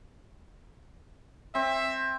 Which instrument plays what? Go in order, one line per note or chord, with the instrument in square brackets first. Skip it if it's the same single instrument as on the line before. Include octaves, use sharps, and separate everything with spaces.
[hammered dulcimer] C4 [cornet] E5